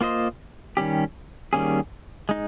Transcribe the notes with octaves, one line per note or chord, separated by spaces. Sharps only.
A#3 F4 C5 D#5
D#3 G3 C#4 G4
D#3 G3 A#3 C#4 G#4
G#3 D#4